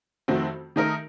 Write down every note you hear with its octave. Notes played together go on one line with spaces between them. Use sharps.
F2 D#3 A3 C4 F#4
D#3 A3 D#4 A#4